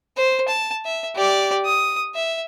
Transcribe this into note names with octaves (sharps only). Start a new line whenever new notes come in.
C5
A5
E5
G4 D5
D#6
E5